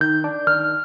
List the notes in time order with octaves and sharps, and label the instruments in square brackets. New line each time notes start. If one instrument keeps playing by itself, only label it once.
[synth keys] D#3 [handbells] G6
[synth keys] D4
[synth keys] D#3 [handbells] F6